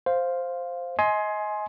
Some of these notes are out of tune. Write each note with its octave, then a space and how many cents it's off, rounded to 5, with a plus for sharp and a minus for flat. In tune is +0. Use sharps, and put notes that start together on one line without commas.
C5 +0 F5 +0
D#5 +25 G#5 +20 C6 +10